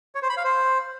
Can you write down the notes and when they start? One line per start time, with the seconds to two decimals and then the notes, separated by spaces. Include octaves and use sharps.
0.15 C#5
0.22 C5
0.30 B5
0.37 F5
0.44 C5